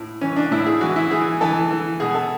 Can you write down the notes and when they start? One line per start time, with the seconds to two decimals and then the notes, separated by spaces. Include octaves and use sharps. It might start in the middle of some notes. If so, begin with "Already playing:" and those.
Already playing: A2
0.21 E3 C#4
0.36 D4
0.51 A2 E4
0.66 G#4
0.81 E3 F#4
0.96 E4
1.11 E3 G#4
1.41 E3 A4
1.71 E3
2.00 B2 G#4
2.15 A4